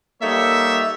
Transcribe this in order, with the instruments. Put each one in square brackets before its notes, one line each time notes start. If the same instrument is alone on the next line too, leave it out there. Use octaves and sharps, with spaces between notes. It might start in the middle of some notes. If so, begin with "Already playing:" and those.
[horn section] G3 A#3 D#4 A4 C#5 E5